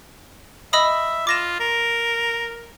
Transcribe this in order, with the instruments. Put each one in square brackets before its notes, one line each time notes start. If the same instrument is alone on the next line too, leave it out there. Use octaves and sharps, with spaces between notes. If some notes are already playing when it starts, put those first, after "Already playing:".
[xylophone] D#5 B5 D#6 [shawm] E5
[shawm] F4 [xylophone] D6 A#6 E7
[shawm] A#4